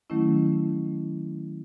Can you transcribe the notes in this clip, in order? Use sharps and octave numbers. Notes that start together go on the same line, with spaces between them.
D#3 F#3 A3 C#4 E4